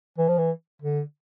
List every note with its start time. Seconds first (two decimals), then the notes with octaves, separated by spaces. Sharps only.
0.18 E3
0.28 F3
0.38 E3
0.82 D3